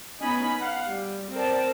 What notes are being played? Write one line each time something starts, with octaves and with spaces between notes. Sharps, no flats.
B3 C#4 D#4 D#5 G#5 B5
F5 F#5
G3
C4 A#4 D5 A5